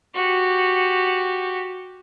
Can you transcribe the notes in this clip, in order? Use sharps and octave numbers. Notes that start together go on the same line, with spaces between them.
F#4 G4